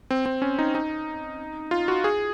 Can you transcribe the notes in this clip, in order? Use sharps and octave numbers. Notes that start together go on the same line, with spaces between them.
C4
C4
C#4
D#4
D#4
F4
F#4
G#4